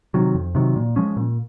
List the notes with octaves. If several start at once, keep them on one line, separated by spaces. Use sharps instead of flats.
C3 D#3 F#3
F2
C3 D#3 F#3
A#2
F3 G#3 C#4
A#2